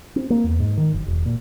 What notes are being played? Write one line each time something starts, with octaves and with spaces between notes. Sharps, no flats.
C4
A#3
E2
G#2
D#3
F#1
E1
A#2